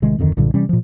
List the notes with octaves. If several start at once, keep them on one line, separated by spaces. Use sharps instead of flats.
A1 C3 D#3 G#3
D1 F2 D3 D#3
B1 G2 A#2 D3
C3 E3 G3 C#4
A#2 F3